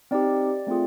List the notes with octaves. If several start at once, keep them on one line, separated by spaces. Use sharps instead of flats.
C4 D#4 G4 D5
A3 C4 F4 G#4